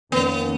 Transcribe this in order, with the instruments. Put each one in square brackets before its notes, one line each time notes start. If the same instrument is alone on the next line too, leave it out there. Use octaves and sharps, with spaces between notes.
[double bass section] F2 D#3 A#3 C#4 [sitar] B3